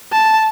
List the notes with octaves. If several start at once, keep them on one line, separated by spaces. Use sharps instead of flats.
A5